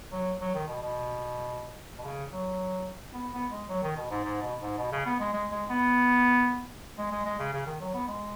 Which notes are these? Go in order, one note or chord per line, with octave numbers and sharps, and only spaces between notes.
F#3
F#3
D#3
B2
B2
B2
C#3
F#3
B3
B3
G#3
F#3
D#3
B2
G#2
G#2
B2
G#2
B2
C#3
B3
G#3
G#3
G#3
B3
G#3
G#3
G#3
C#3
C#3
D#3
F#3
B3
G#3